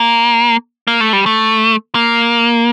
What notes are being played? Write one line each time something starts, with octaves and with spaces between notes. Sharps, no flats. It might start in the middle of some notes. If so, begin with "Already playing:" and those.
Already playing: A#3
A#3
A3
G3
A3
A#3